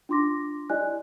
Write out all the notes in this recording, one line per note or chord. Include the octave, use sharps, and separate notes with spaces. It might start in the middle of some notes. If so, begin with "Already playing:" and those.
D4 F4 C6 D6 A#6
E4 G4 D5 D#5 G#5 F#6